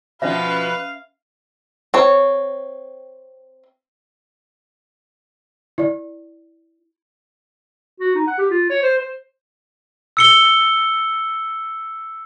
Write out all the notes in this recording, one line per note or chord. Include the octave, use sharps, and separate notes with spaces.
B2 F3 C#4 B4 E5 F5
C4 C#5
E4 D5
F#4
D#4
F#5
G4
F4
C#5
C5
C5
E6 C#7 G7